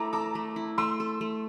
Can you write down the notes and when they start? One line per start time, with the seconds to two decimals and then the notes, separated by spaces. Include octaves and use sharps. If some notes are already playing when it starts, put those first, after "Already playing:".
Already playing: A3 E4 A5 A#5 D6
0.13 A4 A#5 D6
0.35 A3
0.56 E4
0.78 A3 C6 E6
1.00 A4
1.21 A3